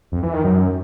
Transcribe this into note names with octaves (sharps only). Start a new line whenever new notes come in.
F2
E3
D#3
F#2